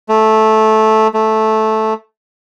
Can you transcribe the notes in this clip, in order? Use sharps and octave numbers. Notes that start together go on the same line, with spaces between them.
A3
A3